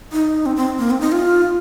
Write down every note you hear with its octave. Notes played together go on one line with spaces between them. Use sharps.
D#4
C4
C4
A#3
C4
D#4
F4